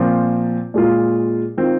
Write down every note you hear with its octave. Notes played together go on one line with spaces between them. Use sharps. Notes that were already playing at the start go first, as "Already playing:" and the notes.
Already playing: A#2 F3 C4 F4
A#2 G#3 F4
D#3 C4 F4